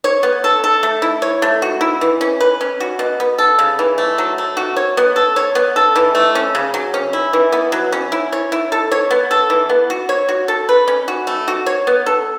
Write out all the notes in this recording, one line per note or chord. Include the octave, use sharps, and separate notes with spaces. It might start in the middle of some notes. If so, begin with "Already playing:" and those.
C#5
B3
A4
A4
A3
E4
C#5
A3
F#4
E4
E3
C#4
B4
C#4
F#4
B2
B3
A4
C#3
E3
A3
F#3
A3
F#4
C#5
B3
A4
C#5
B3
A4
E3
A3
C#4
C#3
F#3
C#4
E4
E3
B3
F#3
C#4
E4
C#5
E4
A4
C#5
B3
A4
E3
B3
F#4
C#5
F#4
A4
B4
C#4
F#4
A3
F#4
C#5
B3
A4